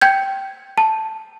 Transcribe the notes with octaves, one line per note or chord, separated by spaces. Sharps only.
G5 G6 G#6
A5